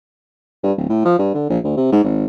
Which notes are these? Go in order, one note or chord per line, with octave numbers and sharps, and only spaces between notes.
G2
D1
A2
F3
G2
D3
A#1
D2
C3
G#2
G#1